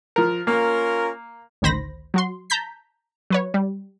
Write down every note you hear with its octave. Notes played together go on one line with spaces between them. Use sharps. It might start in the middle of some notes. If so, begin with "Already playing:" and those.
F3 A#4
A#3 C#4 F4 A#4
A1 D2 D#3 C5 B5 A#6
F#3 F#4 C6
A5 A#5 G6 B6
F#3 B4 C#5
G3